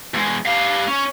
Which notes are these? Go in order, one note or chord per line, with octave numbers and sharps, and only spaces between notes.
E2 G#3
G3 F5
C#4